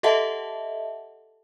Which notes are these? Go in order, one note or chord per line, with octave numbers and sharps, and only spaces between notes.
G4 A4 D#5 E5 F#5 A5